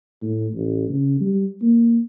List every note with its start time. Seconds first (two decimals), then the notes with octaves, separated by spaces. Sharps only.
0.22 A2
0.54 A1
0.90 C#3
1.21 G3
1.62 A#3